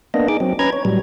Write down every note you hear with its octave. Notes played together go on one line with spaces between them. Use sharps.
A#3 B3 D4 D#5
D#4 G#4 D6
F#3 C4
C#4 B4 A#5 G#6
C#5
A2 F#3 G3